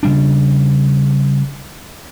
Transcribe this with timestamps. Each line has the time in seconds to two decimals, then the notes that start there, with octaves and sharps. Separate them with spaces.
0.03 C#3 G3 D4